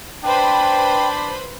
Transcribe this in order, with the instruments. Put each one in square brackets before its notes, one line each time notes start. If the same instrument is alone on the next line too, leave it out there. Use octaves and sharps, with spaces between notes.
[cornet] D4 [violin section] B4 C5 B5 [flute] G5